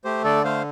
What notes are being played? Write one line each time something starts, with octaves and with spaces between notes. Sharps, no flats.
A3 G4 C5
D3 A4 D5
A3 C5 F5